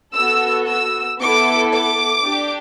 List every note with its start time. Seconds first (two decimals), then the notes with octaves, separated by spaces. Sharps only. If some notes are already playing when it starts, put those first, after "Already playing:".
0.15 B3 F#4 A4 E6
0.68 E6
1.20 B3 E4 A4 D6
1.72 D6
2.25 D4 G4